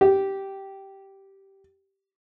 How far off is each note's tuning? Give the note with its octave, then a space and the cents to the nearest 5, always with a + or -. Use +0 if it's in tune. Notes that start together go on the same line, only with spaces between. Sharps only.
G4 -10